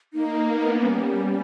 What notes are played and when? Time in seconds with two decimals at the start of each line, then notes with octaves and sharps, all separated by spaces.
0.13 A#3 D#4
0.46 B3
0.81 G3 C#4